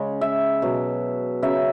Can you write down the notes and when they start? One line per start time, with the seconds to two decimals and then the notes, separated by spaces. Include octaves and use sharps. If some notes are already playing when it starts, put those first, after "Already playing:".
Already playing: C#3 G#3
0.21 E5
0.62 B2 F#3
1.43 C#3 F#3 E5